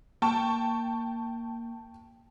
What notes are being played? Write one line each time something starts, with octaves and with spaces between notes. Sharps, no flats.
A#3 G5 A5 C#6